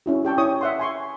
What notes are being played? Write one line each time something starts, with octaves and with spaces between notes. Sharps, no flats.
C#4 E4 F#4
G4 G5 A5 C#6
E4 C#5 C#6 D#6
E5 F#5 C6
G#5 C6 C#6